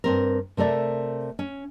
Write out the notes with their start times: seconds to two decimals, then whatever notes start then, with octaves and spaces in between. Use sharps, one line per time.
0.04 G2 C4 A#4
0.57 C3 A3 A#4 D5 E5
1.39 C#4